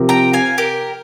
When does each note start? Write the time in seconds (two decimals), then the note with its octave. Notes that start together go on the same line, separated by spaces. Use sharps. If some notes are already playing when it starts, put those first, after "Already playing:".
Already playing: C3 F3 C4 G4 A#4
0.09 G5 A#5
0.33 F5 G#5
0.58 G4 A#4